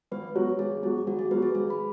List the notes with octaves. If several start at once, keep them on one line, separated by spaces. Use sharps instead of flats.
G#1 B4
G#2 F#3 B3 F#4 C#5
G#1 G#4
G#2 F#3 B3 F#4 G#4
G#1 F#4
G#4
G#2 F#3 B3 F#4 B4
G#4
G#1 G#4
B5